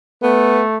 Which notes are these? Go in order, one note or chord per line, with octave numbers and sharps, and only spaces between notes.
A3 B3